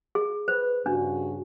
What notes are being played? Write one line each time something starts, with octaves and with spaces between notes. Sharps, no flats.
G#4
B4 C5
G2 C#3 D4 F#4